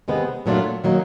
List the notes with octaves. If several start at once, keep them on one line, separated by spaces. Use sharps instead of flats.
C3 D#3 G#3 B3
A#2 F#3 A3 D4 F4
D#3 F#3 A#3 D#4